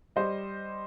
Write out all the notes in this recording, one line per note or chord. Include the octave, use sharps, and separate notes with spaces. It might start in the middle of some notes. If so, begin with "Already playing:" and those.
G3 C5 D#5